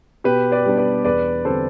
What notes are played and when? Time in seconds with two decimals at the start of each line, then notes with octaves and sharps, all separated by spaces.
0.24 B2 G4 B4
0.52 B4 D5
0.65 G3 B3 D4
0.78 B4 D5
1.04 E2 B4 D5
1.45 D3 G3 C4 A4 C5